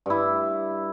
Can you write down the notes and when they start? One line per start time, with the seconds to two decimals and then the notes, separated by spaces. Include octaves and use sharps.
0.06 G2 E4